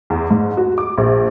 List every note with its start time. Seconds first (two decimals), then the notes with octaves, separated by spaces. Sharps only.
0.10 E2
0.31 G#2
0.57 F#4
0.78 D6
0.98 A#1